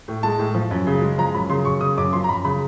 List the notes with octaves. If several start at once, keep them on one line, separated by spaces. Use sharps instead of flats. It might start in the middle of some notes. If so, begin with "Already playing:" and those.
A2
G#3 A5
A2
F3
F#2
C#3
G#3
F3 A#5
F#2 B5
C#3 C6
F#2 C#6
C#3 D#6
F#2 D6
F3 C6
A#5
F#2 B5
C#3 B5